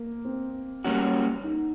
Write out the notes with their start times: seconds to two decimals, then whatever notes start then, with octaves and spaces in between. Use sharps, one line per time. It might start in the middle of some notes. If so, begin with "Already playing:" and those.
Already playing: A#3
0.25 C4
0.84 G3 A#3 C#4 F#4
1.43 D#4